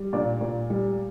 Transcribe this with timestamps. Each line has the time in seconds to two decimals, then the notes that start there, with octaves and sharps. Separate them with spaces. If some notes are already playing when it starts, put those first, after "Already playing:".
Already playing: G3
0.13 A#2 D4 D5
0.41 A#2
0.70 G3